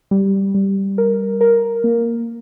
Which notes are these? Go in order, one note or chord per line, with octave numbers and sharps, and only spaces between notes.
G3
G3
A#4
A#4
A#3